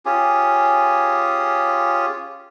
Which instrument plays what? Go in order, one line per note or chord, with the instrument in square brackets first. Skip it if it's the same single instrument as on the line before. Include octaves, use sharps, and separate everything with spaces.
[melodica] C#4 F4 G4 G#4